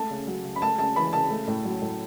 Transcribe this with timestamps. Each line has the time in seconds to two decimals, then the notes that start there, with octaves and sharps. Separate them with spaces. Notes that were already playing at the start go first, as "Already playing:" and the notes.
Already playing: A3 A5
0.11 C#3
0.27 F#3
0.45 C#3
0.56 B5
0.62 A3 A5
0.78 C#3 A5
0.96 E3 B5
1.13 C#3 A5
1.30 A3
1.47 A2
1.65 F#3
1.82 A2